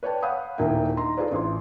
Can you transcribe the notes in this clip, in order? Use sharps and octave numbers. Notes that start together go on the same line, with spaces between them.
B4 C#5 D5 G5 A5
C#5 F5 F#5 B5 D#6 G6
D#1 D#2 A#2 A#3 E4 G5
D#4 A#5 C6
F4 G#4 A4 B4 C5 D5
A1 C6